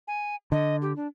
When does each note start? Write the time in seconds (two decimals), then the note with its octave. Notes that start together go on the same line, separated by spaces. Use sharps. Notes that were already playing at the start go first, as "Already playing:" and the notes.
0.08 G#5
0.52 D3 D#5
0.82 G4
0.96 D4